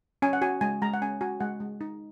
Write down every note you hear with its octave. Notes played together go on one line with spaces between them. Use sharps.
C#4 G#5
F#5
F#4 G#5
G#3 G#5
G#3 A#5
F#5
C#4 G#5
F#4 G#5
G#3 F#5
G#3
D#4